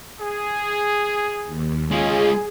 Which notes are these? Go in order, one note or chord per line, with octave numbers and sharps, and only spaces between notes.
G#4
D#2
G#3 C#4 F4 G#4 D#5